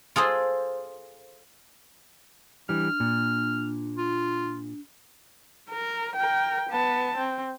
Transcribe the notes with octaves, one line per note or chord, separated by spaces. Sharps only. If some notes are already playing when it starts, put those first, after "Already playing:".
F4 G#4 A4 C5
E3 G3 D4 F6
A#2
F4
A#4
A#4 G5
B3 A5
C4